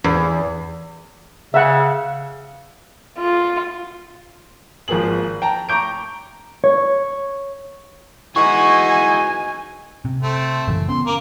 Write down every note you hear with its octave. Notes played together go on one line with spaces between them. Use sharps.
E2
C#3 E5 F#5
F4
G#1 F3 A#3 G#4 F#7
G5 A5 A#5
A#5 C#6 D6 G6 D7
C#5
E3 G#3 D#4 F#4 G#5 C#6
C3
A3 C4
F#2 C#3 E3
B3 C#4 C6
A#3 A#4 D6